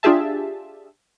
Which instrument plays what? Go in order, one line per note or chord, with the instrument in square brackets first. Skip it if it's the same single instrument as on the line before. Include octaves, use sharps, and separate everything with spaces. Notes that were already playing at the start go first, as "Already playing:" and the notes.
[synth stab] D4 F4 G4 G#4 E5 A5